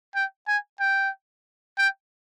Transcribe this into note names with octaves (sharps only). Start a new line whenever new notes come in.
G5
G#5
G5
G5